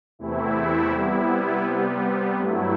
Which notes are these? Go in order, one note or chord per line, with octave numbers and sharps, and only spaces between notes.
E2 C3 E3 A3 E4
C3 G3 B3 E4
C3 G3 B3
G2 F#3 A3 E4